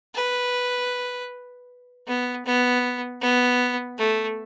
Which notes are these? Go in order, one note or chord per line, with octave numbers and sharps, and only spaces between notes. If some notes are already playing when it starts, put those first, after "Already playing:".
B4
B3
B3
B3
A3